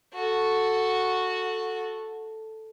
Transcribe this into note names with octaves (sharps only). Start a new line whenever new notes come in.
F#4 A4